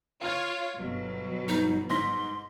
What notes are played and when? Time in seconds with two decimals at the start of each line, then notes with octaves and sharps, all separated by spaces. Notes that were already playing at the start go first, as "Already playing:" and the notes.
0.21 F4 C#5 F5 F6 G#6
0.78 G1 B2 F#3
1.48 B3 D#4 A#5
1.90 G#2 C6 A#6 B6